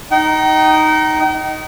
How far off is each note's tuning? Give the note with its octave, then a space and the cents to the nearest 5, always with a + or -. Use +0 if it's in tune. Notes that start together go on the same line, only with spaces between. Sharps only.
D#4 +0 G5 -40